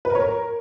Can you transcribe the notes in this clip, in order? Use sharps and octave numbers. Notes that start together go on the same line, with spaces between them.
B4
A#4
C#5
A#4